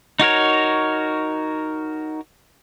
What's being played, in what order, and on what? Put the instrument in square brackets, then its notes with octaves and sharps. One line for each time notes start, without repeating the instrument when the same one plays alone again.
[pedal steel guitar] D#4 F#4 A#4 C#5